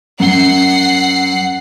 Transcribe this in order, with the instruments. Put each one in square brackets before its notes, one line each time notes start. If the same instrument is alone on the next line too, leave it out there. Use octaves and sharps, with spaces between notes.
[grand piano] F#2 G7 [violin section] F#5 C7